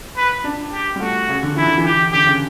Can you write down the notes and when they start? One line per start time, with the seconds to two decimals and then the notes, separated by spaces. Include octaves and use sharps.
0.17 B4
0.44 D4
0.73 G4
0.96 G3
1.00 A3 F#4
1.29 C#3
1.43 D3
1.56 E3 E4
1.67 D3
1.78 E3
1.85 G4
2.12 D3 G4
2.26 C#3